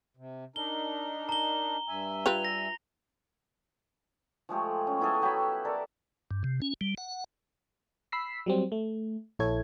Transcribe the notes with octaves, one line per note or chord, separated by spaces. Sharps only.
C3
D4 D#4 A#4 G7
A#5 G7
G2 E5 G#5
F4 G4 B4 F7
A#6
F3 G#3 A3 G4
C#4
B3 E4 G#4 A4
F#3 G4 A4 B5
A4 A#4 D5
G2
C3
C#4
G3
F#5
B5 E6 B6 C7
F#3 G3 C4
A3
A#1 E4 A4 C#5 G#6